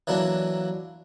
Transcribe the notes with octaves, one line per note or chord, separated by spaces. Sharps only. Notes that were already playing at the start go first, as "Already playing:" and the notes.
E3 F#3 A#3 D4